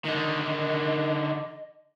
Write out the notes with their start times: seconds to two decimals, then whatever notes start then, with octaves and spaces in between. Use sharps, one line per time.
0.05 D3 D#3 D#5